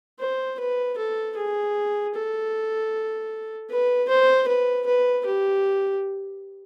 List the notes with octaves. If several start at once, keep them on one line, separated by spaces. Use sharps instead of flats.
C5
B4
A4
G#4
A4
B4
C5
B4
B4
G4